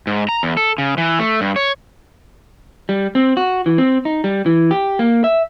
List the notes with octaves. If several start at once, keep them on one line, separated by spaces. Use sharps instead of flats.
G#2
A#5
E2
A4
C#3
E3
A3
G2
C#5
G3
C4
F#4
E3
C4
D#4
G3
E3
G4
A#3
E5